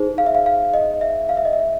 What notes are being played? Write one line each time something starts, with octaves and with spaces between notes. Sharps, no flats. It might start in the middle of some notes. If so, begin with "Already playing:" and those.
Already playing: D#4 G#4 C5
F5
E5
F5
F5
D#5
E5
F5
E5
D#5
E5